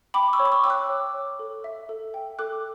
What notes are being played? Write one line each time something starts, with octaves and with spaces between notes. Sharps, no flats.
G5 B5 D6
C#6 E6
C#5
D6
C#6 E6
G5 E6
D6 F#6
C#5
C#5
A4
E5
A4
G5
A4 D6 F#6